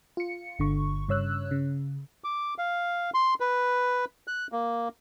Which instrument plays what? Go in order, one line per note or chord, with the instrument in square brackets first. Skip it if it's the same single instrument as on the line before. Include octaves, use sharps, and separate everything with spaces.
[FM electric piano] F4 C#7
G1 D3 C#6
G2 C#3 C#5 E6 F#6
C#3
[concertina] D6
F5
C6
B4
F#6
A#3